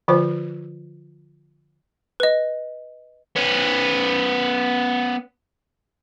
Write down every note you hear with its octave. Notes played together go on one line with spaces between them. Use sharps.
D3 F3 F4 C5
B4 D#5
B3 C#4